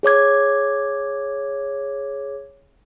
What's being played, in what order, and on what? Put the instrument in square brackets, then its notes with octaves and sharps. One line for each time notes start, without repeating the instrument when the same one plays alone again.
[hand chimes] G#4 C#5 D6 G#6